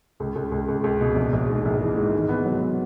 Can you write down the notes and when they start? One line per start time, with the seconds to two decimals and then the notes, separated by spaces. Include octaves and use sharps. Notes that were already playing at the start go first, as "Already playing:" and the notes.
0.20 C#2
0.35 C#2
0.52 C#2
0.68 C#2
0.84 C#2
1.01 B2
1.16 A#1
1.33 A#1
1.49 G#2
1.65 A#1
1.81 E3
1.97 G#2
2.14 D#3
2.29 B3
2.46 F#3
2.62 B3